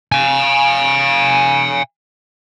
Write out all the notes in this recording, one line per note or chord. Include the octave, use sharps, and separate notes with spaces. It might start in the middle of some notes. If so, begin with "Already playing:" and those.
F5 G#5